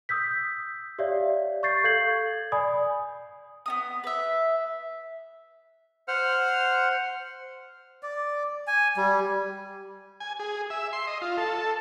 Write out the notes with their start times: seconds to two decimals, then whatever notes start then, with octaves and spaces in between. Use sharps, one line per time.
0.09 D#6 E6 G6 B6
0.99 G4 C#5 D5 E5 F5
1.63 C#6 G6 A6 C7
1.84 A4 F5 G6 G#6 C7 F#7
2.52 D5 G#5 B5 D#6
3.66 B3 D#4 D#6
4.04 B4 E5
6.08 C5 F#5 F6
8.03 D5
8.67 G#5
8.97 G3
10.20 G#5
10.39 G#4
10.70 E5
10.93 C6
11.07 D#5
11.22 F4
11.38 A4